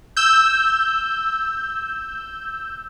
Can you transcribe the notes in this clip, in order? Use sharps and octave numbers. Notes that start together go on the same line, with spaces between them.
E6 G6